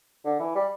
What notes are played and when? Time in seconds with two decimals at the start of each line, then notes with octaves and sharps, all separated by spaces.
0.25 D3
0.40 E3
0.55 G3